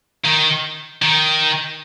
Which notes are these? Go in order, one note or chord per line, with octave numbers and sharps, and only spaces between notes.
D#3
D#3